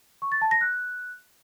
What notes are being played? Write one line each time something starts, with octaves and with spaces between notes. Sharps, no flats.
C#6
A6
A5
A#6
F#6